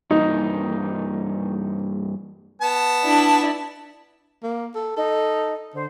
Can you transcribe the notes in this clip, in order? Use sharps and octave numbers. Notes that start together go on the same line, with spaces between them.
G2 E3 A#3 D#4
B3 A5
D4 E4
A#3
A4
D#4 A4
D3 C5